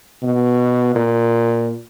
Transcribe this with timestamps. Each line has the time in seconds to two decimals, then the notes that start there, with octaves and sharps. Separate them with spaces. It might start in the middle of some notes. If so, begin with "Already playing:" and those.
0.23 B2
0.95 A#2